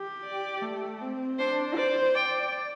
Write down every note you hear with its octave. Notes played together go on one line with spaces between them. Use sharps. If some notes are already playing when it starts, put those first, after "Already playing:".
Already playing: G4
D5
A3
C4
D4 C5
C5 D5
D5 G5